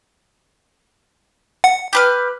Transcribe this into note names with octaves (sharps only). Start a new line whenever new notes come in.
F#5
G4 B4 F6